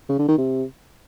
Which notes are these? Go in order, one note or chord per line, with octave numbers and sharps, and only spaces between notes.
C#3
D3
D#3
C3